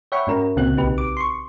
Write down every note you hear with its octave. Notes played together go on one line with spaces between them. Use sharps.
C#5 E5 F#5 G5 B5 C#6
G#2 C#4 F#4 A#4 A#5
C#2 A#2 C#3 C4 F#4 F#6
B1 A#2 D#4 G4 B4
D6
C6 C#6